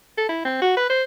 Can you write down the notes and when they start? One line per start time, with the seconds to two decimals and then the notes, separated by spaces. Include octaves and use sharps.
0.18 A4
0.29 E4
0.45 C4
0.62 F#4
0.77 B4
0.90 C5